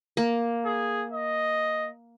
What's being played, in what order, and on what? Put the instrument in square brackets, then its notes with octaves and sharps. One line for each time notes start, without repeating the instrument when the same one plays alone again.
[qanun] A#3
[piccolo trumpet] G#4
D#5